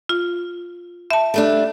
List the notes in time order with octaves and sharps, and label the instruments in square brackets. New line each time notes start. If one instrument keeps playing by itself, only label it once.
[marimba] F4
E5 A5
[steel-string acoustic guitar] G3 A3 D4